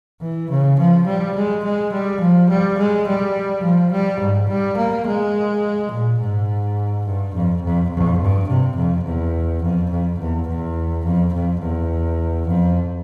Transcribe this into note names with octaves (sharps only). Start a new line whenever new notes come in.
E3
C#3
F3
G3
G#3
G#3
G3
F3
G3
G#3
G3
F3
G3
G#2
G3
A#3
G#3
A#2
G#2
G2
F2
F2
F2
G2
C3
F2
E2
F2
F2
E2
E2
F2
F2
E2
F2